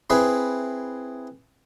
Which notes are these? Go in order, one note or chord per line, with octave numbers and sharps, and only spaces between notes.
C4 E4 G#4 B4